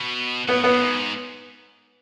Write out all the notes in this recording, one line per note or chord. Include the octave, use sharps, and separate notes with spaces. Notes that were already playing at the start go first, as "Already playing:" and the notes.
Already playing: B2
A2 B3
A2 B3
G#2